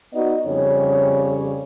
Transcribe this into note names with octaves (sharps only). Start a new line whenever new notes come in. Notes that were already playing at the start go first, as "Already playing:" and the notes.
B3 D#4 F#4 D5 D#5
F2 C#3 G3 C#5